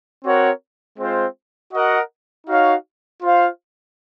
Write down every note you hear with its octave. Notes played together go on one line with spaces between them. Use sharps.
C4 F#4 A#4 C#5 F#5
G#3 C4 F4 C5
F#4 A#4 D#5 F#5
D#4 F#4 C#5 F5
F4 C5 F5